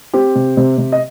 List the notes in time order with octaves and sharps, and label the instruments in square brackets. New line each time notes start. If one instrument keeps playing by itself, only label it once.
[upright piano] C4 G4
C3
C3
C3
D#5